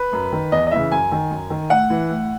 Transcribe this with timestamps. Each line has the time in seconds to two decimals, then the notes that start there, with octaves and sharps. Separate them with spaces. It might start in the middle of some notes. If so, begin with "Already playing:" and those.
Already playing: B4
0.13 F#2
0.32 D#3
0.52 E2 D#5
0.67 D#5
0.71 C#3 E3 E5
0.92 F#2 G#5
1.12 D#3
1.31 F#2
1.50 D#3
1.70 A2 F#5
1.90 E3
2.10 A2